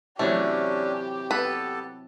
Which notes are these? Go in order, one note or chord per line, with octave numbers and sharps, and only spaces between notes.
C3 E3 F#3 A3 C#4 D4 G4
B3 A4 B4 A5